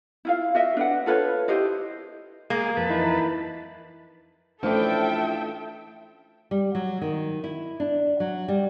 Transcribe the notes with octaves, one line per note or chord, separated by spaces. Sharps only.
E4 F4 F5
F#4 D#5 E5
D4 B4 F#5
F4 A4 B4 C#5
E4 G4 C5 D#5
G#3 A#3 G#4
F2 B4 A5
E3 D#4 E4
E3 F3 A3 C#4 D4 A4 E5 G5
G3
F#3
D#3
E4
D4
F#3
G3